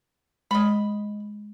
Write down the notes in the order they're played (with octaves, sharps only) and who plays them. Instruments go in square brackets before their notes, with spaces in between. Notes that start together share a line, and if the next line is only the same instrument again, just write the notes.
[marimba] G#3 [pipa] D#5 B5